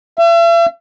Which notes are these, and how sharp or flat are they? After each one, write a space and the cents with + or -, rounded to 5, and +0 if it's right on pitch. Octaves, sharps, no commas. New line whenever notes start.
E5 +45